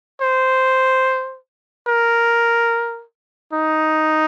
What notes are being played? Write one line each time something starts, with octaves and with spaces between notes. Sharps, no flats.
C5
A#4
D#4